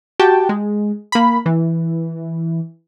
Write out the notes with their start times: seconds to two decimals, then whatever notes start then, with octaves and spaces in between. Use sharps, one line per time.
0.19 F#4 G4 G5 A5
0.49 G#3
1.12 A#3 B5
1.46 E3